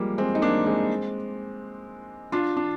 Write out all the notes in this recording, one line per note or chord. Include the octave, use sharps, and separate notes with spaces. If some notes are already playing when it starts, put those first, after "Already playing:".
Already playing: F3 G3 G#3 A#3
G#3 C4
D#4
A#3 D4
G#3 C4
D4 F4
D4